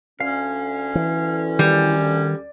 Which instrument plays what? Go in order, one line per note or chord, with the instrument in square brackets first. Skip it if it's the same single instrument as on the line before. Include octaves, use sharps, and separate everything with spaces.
[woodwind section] D2 D3 C#4 [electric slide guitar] F5
[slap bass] E3
[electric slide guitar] D#3 [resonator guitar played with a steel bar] G3